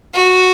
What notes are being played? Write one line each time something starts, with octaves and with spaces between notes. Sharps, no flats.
F#4